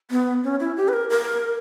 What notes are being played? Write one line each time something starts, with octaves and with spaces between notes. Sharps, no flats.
B3
C#4
E4
G4
B4
A#4
A#4